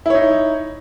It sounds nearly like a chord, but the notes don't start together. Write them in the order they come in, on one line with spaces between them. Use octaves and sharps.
E4 C#5 D#4